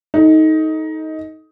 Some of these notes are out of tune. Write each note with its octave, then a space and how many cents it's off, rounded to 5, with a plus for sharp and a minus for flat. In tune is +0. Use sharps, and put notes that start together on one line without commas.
D#4 +15 A4 -20